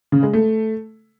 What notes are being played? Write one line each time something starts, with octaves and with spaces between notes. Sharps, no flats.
C#3
G#3
A3